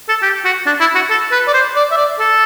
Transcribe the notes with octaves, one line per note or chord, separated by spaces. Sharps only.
A4
G4
F#4
D4
E4
F#4
A4
B4
D5
C5
D5
E5
D5
A4